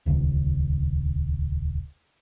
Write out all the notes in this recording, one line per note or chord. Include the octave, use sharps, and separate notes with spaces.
D#1 C#2